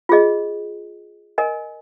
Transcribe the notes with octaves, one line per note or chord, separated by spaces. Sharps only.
F4 G#4 D#5
A#4 D#5 G#5